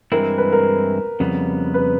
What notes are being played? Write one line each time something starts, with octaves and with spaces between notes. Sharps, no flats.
G2 E3 G#3 C4 E4 A#4
B4
A#4
F2 C#3 G3 B3
B4